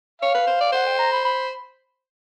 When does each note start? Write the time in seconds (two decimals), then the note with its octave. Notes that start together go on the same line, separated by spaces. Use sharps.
0.22 C#5 F5
0.35 B4
0.47 C5
0.61 D5
0.72 C5 F#5
0.86 G5
0.99 A#5
1.12 B5
1.25 B5